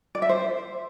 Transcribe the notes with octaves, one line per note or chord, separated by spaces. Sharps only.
D5
E5
C5